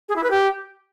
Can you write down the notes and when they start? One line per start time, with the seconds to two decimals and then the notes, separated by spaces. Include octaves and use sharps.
0.09 G#4
0.16 E4
0.23 B4
0.31 G4